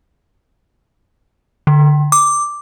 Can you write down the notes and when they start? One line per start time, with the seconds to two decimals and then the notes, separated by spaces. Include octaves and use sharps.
1.67 D3
2.12 D6